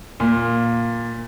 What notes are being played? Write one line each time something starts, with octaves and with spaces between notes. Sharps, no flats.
A#2